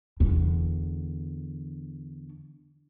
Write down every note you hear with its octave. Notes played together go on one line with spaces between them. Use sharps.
E2 D3